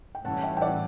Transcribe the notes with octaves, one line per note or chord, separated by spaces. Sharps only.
G5
A2 E3 G3 C#4 F#5 A5
E5 G5
G5
D5 F#5